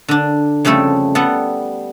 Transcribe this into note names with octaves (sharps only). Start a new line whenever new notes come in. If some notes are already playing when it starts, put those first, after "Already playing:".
D3 D4
F2 C#3 G3 A3 A4
G3 B3 A4 F#5